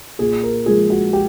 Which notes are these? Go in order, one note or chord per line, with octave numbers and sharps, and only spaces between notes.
A#2 G#4
A#4
F3 G#3 G#4
F#4
G4